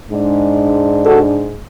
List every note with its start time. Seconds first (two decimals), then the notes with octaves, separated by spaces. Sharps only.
0.10 G#2 G#3 D4
1.04 F#4 A4